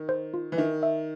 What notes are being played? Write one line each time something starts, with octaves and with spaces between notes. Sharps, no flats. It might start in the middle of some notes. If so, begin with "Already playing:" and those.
Already playing: D#3
C5
F4
E3
D#3 E5
E5